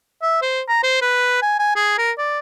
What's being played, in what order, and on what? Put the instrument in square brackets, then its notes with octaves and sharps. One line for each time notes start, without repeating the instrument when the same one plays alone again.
[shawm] E5
C5
A#5
C5
B4
G#5
G#5
G#4
A#4
D5